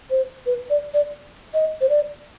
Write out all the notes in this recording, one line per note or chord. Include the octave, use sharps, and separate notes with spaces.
C5
B4
D5
D5
D#5
C5
D5